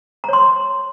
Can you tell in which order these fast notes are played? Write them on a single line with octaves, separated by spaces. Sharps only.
A#5 C#5 C6